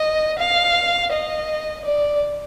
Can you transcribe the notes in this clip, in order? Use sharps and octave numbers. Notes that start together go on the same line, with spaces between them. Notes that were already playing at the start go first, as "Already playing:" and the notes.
Already playing: D#5
F5
D#5
D5